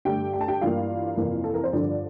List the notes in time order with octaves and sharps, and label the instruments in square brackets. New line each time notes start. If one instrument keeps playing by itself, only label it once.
[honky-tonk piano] G2 D3 A3 G4 G5
G5
A5
G4 G5
G2 E3 A#3 F4 F5
F2 C3 E3 A#3
A4
A#4
C5
G2 D3 F3 D4 D5